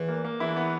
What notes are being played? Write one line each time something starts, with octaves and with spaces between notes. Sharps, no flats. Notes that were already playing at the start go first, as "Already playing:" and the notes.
Already playing: E2 E3
A#3
A#3
E2 E3 E4
B3